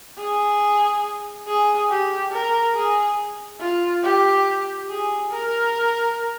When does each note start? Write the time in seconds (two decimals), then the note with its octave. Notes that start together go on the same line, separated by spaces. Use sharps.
0.18 G#4
1.47 G#4
1.90 G4
2.32 A#4
2.75 G#4
3.60 F4
4.03 G4
4.89 G#4
5.31 A#4